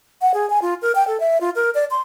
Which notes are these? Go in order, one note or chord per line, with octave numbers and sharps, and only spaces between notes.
F#5
G#4
G#5
F4
A#4
G5
A4
E5
F4
A#4
D5
C6